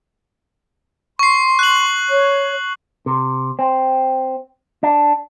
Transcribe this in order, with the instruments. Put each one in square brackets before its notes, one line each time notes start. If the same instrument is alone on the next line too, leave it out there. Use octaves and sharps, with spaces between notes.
[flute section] C6 [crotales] C#6 C7
[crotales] F#6 F#7
[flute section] C#5
[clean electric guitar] C3
C4
D4